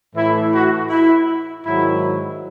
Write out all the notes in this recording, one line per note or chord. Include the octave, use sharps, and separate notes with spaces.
A2 E3 E4
F#4
E4
G#2 D#3 F#3 E4